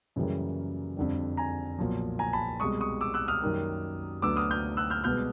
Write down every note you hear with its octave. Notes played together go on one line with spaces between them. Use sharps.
F#2 C#3 E3 G3 A#3
F2 D3 G3
G#5 A#5
B1 A#2 F3
G#5 A#5
A5 B5
C2 B2 G#3 C#6 D#6
C#6 D#6
D6 E6
E6 F#6
D#6 F6
F#2 D#3 G3 A#3
D2 D3 F#3 B3 D6 E6
D#6 F6
F6 G6
E6 F#6
F6 G6
C2 B2 G#3 B3 F6 G6